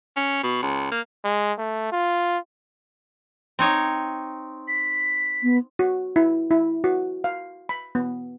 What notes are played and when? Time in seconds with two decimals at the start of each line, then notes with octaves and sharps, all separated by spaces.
0.17 C#4
0.43 B2
0.62 C#2
0.92 A#3
1.25 G#3
1.58 A3
1.92 F4
3.59 C4 D#4 C#5
4.68 B6
5.43 B3
5.79 F#4
6.16 E4
6.51 E4
6.84 F#4
7.24 F5
7.69 B5
7.95 B3